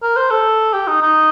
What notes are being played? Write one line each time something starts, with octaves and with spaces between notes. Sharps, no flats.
A#4
C5
A4
G4
D#4
D#4